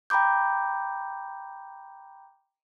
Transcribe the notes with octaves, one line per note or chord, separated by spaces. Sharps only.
G5 A#5 B5 D6 G6